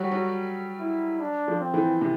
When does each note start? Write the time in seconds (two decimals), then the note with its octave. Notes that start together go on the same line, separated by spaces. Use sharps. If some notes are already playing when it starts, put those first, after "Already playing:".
Already playing: F#3 G3 F#4
0.12 F#3
0.80 E4
1.20 D4
1.48 F3
1.60 C4
1.74 E3
2.01 C3